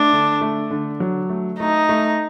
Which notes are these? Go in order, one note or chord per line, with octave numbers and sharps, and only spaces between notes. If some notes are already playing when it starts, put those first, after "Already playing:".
Already playing: A3 D4
D3
A3
D3
F#3
A3
A3 D#4
A3